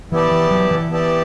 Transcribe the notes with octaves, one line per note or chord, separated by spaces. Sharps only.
E3 B3 E4 G4 D5 A5
E3
F#3
E3
B3 E4 G4 D5 A5